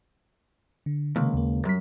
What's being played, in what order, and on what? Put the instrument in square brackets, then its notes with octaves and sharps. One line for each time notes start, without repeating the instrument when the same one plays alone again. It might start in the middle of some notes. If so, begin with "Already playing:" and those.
[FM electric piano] D3
[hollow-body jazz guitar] C#2 [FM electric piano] C3 D#3 A#3
[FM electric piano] D#2 A#3
[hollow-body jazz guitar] F#2 [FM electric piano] G3 B6